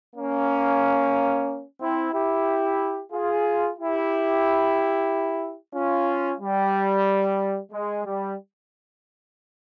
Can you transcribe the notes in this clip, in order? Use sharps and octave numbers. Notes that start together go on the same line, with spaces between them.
A#3 C#4
C4 E4
E4 G4
F4 G#4
E4 G4
C#4 F4
G3
G#3
G3